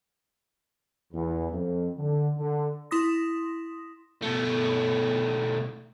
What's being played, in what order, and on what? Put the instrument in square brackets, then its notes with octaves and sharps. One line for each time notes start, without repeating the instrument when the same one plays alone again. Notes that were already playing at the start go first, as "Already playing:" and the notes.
[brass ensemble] E2
F2
D3
D3
[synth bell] E4 C6 D#6 A#6
[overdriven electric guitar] B2 A3